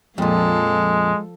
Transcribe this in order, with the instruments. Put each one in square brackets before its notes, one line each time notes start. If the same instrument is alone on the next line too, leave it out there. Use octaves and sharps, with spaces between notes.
[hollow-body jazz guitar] F2 A#2 [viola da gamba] F3 A4 [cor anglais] G#3